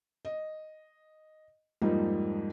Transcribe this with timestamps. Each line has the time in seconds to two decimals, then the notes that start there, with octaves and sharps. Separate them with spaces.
0.25 D#5
1.82 F2 G#2 F3 G3 A#3 D#4